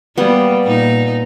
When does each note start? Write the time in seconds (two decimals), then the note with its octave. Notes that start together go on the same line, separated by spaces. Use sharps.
0.18 G3 A#3 B3
0.64 A#2 D#4